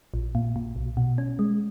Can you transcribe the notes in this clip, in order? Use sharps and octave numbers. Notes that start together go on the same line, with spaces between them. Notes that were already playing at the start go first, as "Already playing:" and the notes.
A#1
A#2
A#2
B1
B2
C#4
G#3